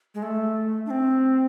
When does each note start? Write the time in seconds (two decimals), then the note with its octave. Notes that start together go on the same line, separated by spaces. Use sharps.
0.15 G#3
0.23 A3
0.86 D4
0.90 C4